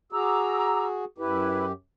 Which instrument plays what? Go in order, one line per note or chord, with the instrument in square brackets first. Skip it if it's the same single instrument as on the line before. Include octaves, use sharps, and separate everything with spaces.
[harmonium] F#4 G#4 [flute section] A#5 D6 E6
[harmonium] F#2 G4 [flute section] E4 B4